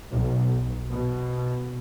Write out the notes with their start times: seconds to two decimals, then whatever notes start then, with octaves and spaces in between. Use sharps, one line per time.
0.15 B1
0.92 B2